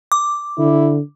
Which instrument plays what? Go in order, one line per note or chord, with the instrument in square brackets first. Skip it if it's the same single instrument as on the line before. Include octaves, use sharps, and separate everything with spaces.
[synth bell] D6
[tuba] D3 [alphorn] E4